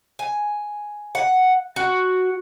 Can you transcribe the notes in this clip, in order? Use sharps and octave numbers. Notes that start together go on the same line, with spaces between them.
G#5
F#5
F#4